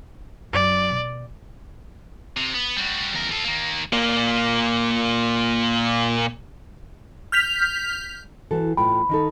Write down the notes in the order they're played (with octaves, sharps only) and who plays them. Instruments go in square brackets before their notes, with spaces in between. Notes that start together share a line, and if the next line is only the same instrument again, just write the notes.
[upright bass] F#2 [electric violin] D5
[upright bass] B2
[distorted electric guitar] C3
B3
G3 F#4
E2 A#4
F4 A4
D#3 A#3
[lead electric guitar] A#2 A#3
[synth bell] F6 G6 B6 F7
[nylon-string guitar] E3 F#4 A4
[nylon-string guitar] A2 F4 G5 [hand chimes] B5
[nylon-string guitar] D#3 D#4 A4